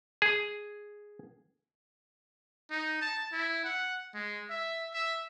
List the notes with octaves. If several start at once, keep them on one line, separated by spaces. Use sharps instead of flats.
G#4
D#4
A5
E4
F#5
G#3
E5
E5